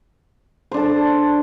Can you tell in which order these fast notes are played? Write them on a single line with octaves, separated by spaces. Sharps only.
C5 D4 A4 D5